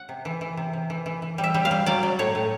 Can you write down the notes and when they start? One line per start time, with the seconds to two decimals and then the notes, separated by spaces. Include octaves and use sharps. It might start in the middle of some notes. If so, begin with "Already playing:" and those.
Already playing: F#5
0.09 C3
0.25 E3
0.41 E3
0.57 C3
0.73 C3
0.90 E3
1.06 E3
1.22 E3
1.38 G3
1.44 E5
1.54 G3
1.65 F5
1.71 G3
1.86 F#3 D5
2.03 F#3
2.19 A2 C#5
2.35 A2